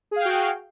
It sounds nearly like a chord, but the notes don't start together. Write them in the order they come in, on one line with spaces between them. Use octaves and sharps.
G#4 F5 G5 F#4